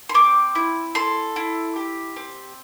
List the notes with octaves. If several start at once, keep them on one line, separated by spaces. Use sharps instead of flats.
C6
C4 D6
E4
A4 C6
E4
G4
C4